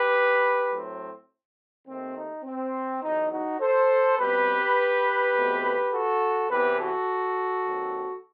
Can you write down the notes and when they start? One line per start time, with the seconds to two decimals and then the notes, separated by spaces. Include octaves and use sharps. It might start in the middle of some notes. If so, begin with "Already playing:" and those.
Already playing: G4 B4
0.71 A2 F#3 C4
1.88 D#2 D#3 A3 C4
2.16 D#4
2.45 C4
3.03 E2 B2 F#3 D#4
3.32 D#4 F#4
3.61 A4 C5
4.19 B2 G3 C4 G4 B4
5.35 E2 B2 A3 C4
5.92 F#4 A4
6.50 E2 C3 E3 B3 G4 B4
6.80 F#4 A4
7.67 D#2 D#3 F#3 C4